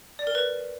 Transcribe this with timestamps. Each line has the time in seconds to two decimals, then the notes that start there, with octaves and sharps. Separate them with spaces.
0.19 D5
0.27 A#4
0.35 B4